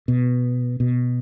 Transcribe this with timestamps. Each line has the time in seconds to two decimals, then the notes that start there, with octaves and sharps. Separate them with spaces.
0.08 B2
0.80 B2